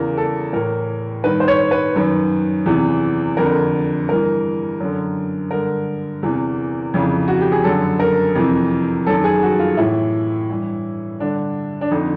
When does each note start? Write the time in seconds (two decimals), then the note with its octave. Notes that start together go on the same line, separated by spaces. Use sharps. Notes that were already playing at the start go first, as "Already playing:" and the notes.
Already playing: E2 C#3 E3 A#4
0.17 A4
0.53 A2 E3 A#4
1.24 G2 D#3 B4
1.40 C5
1.48 C#5
1.71 B4
1.96 F#2 D#3
2.66 E2 C3 E3
3.37 F2 D3 A#4
4.09 G2 E3 A#4
4.80 F#2 D3
5.51 G2 D3 A#4
6.23 E2 C3 E3
6.94 F2 C#3 E3
7.28 F#4
7.41 G4
7.52 G#4
7.64 F#2 D3 A4
8.00 A#4
8.35 F2 C3 E3
9.07 F#2 D#3 A4
9.24 G#4
9.43 F#4
9.59 F4
9.77 A2 E3 E4
10.50 G2 E3
11.20 G2 D3 D4
11.81 D4
11.91 F2 D3 D#4